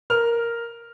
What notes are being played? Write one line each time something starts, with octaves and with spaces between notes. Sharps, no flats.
A#4 F6 F7